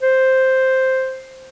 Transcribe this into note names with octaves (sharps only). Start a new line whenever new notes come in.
C5